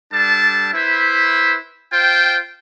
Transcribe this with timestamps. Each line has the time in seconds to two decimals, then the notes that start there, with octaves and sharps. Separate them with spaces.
0.13 G3 D4 A4 A5
0.74 E4 B4 C5 E5
1.93 F4 C5 G5